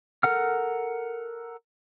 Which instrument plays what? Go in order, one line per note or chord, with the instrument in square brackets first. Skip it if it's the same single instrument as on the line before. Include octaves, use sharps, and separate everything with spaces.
[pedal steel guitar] A4 A#4 F#5 F6